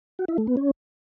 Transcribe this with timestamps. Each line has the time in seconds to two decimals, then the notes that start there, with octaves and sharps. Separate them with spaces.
0.19 F#4
0.28 E4
0.38 A3
0.47 B3
0.57 C#4